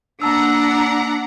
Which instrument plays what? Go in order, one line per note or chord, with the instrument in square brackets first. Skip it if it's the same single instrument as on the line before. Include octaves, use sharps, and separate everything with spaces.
[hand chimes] A#3 A5 E6 [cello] D4 [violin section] F#5 A#5